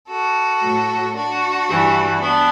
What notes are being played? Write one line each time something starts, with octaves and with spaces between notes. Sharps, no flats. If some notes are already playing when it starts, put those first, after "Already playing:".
F#4 A4
A2 F#3
D4 F#4
G2 E3
B3 D4